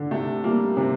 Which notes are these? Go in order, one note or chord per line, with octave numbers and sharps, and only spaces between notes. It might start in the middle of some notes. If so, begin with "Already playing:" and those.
Already playing: D3
C3 A3
G3 A#3
C3 C4